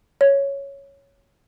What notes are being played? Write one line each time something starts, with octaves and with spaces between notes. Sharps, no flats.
C#5